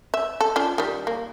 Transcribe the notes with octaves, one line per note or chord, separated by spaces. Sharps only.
E5
A4
C#4 D4 F4
D#3 G3
A#3